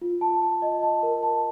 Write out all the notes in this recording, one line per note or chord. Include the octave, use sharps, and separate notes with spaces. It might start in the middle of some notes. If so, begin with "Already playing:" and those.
F4
A5
A5
D#5
A5
A#4
A5